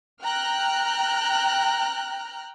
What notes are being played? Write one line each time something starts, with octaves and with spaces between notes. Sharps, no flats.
G5 A#5 F6 F#6